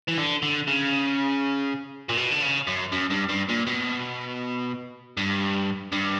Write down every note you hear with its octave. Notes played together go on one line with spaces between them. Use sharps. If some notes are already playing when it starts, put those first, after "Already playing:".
E3
D3
D3
C#3
A#2
B2
D3
C#3
F#2
F#2
G2
G2
A#2
B2
G2
G2